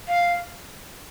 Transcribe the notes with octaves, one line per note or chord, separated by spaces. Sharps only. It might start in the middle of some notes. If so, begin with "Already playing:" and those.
F5